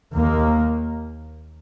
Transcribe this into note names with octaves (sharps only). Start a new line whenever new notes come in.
D#2 D#3 A#3